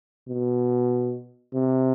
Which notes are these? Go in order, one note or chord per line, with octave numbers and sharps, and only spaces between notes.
B2
C3